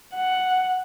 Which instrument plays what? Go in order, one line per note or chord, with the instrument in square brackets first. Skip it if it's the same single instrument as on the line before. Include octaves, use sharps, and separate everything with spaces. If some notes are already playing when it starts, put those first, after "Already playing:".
[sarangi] F#5